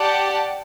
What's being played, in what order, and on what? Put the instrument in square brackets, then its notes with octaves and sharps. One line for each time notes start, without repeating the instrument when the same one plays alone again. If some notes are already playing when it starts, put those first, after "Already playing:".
Already playing: [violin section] G4 D5 F#5 A5